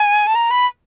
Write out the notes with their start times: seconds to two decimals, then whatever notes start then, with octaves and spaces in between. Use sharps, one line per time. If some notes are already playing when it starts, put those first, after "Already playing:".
Already playing: G#5
0.27 A5
0.35 A#5
0.51 B5